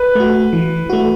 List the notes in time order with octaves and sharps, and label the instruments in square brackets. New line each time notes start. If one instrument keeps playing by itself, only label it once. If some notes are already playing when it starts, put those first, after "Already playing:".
Already playing: [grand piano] B4
[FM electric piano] A3 F#4
E3
A3 F#4